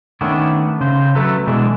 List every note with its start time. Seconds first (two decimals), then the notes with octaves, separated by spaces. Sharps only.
0.21 D#3 A3 B3 C#4 D4
0.81 C#3 C5
1.15 F#3 A3 A4 B4 A#5
1.47 B2 D3 E3 G#3 D4